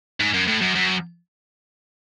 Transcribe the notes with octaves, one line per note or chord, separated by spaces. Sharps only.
G#2
F#2
A2
F#2
F#2